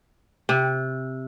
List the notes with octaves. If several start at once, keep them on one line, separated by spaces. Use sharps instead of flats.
C3